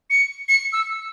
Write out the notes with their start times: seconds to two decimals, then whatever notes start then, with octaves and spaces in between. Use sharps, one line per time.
0.10 C#7
0.48 C#7
0.73 E6